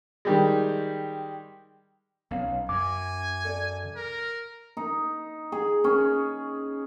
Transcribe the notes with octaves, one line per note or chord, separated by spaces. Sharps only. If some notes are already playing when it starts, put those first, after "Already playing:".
D#3 G3 G#3
B1 C#4 F5
F#2 G#5 D6
A4 D5
A#4
D#4
G#4
C#4